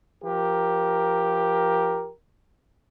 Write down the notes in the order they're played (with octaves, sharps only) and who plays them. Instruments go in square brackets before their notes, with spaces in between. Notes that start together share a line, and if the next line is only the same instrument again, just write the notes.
[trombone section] F3 G4 A#4